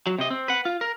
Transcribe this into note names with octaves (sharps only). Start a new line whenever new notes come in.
F#3
C3 D#5
C4
B4 F#5
F4
A#4